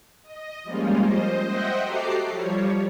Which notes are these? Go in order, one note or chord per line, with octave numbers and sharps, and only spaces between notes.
D#5
F3 G3 G#3 A#3 C#4 F4
C5 D#5
C5 D#5 E5 F#5 G5
F#4 G4 A4 A#5 D6 C7
F3 G3 C#5